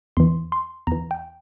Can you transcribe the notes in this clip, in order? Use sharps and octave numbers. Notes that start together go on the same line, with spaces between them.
E2 E3 C6
C6
E2 E3 A#5
G5